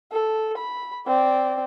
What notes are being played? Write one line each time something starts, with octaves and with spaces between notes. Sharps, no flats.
A4
B5
C4 D5